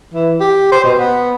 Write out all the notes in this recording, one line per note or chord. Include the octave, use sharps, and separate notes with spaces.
E3
G4
C5
B2
B3